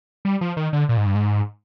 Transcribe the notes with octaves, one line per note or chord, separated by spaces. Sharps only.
G3
F3
D#3
D3
A#2
G#2
G2
G#2